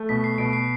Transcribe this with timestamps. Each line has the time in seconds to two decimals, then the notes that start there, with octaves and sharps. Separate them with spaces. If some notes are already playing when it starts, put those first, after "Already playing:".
Already playing: A3
0.09 B2 B6
0.24 C7
0.38 B2 D7
0.53 C7